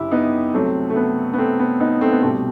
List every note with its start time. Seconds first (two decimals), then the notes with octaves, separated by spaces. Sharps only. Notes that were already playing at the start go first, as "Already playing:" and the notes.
Already playing: F#1 C3 E4 G4
0.11 B3 D#4
0.54 C2 C3 F#3 A3 C4
0.90 A3
0.96 B3
1.33 B3
1.38 A3 C4
1.59 B3
1.80 B3 D#4
2.01 A3 C4
2.12 B3
2.22 C2 B2 G3 A3 C4